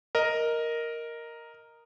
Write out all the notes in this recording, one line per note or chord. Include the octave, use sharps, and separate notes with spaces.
A#4 D#5